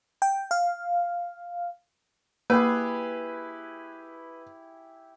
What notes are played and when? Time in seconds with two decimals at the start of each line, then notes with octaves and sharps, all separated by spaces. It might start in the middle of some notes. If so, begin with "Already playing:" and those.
0.22 G5
0.51 F5
2.50 A#3 E4 G4 G#4 B4